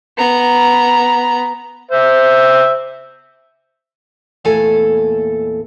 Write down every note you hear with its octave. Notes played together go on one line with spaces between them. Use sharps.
B3 A#5
C5 E5
E2 A#2 A3 E4 A4 G#5